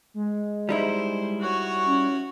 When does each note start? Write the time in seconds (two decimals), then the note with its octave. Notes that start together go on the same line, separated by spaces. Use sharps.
0.14 G#3
0.69 G3 D#4 E4 C5
1.41 F#4 C#5
1.85 C#4